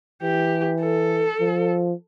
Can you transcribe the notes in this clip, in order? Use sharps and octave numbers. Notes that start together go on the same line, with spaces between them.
E3 G4
A4
F3